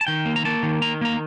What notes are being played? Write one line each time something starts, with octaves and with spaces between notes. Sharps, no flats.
A5
D#3 G5
A#3
A#5
A#3 A5
D#3
D#3 A#5
A#3 A#5